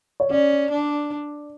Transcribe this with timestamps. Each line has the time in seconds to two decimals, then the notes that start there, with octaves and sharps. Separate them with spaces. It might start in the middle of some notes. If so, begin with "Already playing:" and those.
0.20 C#5
0.30 C#4 D5
0.71 D4